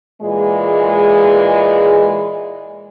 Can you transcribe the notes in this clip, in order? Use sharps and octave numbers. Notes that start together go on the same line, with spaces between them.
A#2 E3 G#3